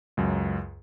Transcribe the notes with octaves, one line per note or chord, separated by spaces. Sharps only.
C#2 F#2